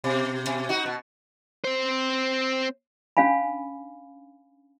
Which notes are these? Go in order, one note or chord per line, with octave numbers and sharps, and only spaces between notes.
B2
B2
D#4 F#4
B2
C4 C5
C#4 D4 F5 G#5 B5